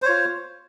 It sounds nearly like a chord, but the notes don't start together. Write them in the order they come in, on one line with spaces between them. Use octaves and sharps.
C5 C#5 F4